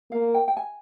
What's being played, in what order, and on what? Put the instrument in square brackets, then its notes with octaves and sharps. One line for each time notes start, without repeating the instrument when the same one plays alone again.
[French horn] A#3 [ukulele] F5
[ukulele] G5
G5
G#5